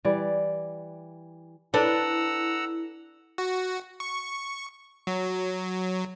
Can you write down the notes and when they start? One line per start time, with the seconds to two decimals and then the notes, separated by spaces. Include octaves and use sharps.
0.05 E3 G3 D5
1.74 D4 E4 A4 B4 F#5 A#5 E6
3.38 F#4
4.00 C#6
5.07 F#3